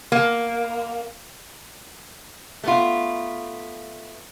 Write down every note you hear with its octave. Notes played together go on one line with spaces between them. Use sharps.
A#3
A3 B3 F4